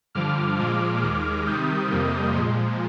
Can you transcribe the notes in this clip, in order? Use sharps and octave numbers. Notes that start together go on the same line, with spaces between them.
G2 D3 F3 D6 F6
A#2 F3 G#3 D6 F6
D#2 D#3 G#3 D6 F6
C3 D#3 G3 D#6 G6
F2 C3 G3 A#3 D#6 G6
A#2 F3 G#3